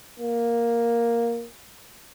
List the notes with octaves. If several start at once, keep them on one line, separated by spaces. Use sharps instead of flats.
A#3